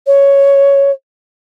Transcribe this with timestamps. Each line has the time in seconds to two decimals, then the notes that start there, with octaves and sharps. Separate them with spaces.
0.06 C#5